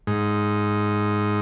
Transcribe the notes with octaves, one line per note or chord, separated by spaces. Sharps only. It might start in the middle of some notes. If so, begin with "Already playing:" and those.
G#2